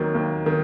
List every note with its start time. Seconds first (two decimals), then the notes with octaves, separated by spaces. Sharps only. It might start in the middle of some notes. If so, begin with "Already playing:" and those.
Already playing: D#2 D#3 F#3
0.15 D#2
0.46 D#3